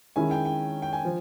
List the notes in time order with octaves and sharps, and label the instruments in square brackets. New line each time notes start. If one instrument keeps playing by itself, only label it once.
[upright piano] D#3 G#3 C#4 E4 [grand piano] G#5
[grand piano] G5
G5
G5
G#5
[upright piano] F3